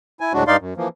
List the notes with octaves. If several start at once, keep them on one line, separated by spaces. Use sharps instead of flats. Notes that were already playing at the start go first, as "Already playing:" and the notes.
E4 G#5
D2 A2 F#3 G#3 D4 F#4
G2 D#4 D5 F5 C6
F#2
E3 F3 A#3